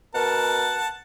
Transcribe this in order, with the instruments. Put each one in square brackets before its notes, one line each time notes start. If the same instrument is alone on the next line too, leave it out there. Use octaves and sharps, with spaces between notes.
[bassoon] B2 [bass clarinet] A#4 [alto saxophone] F#5 [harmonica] A5